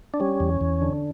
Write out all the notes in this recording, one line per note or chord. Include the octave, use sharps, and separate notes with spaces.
D4
G3 C#4
E2
E2
D3